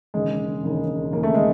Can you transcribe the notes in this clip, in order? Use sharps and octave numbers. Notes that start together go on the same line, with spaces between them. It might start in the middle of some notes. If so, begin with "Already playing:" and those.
E1 D#2 C#3 G#3
E1 D#2 C#3
E1 D#2 C#3 A#3
A3
G#3